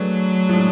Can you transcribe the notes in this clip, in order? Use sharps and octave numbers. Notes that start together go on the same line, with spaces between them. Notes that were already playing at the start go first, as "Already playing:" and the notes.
Already playing: F#3 A3 D4 G#4 B4
A2 F3 G#3 D4